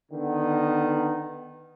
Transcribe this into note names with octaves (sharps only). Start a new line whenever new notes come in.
D3 D#3 B3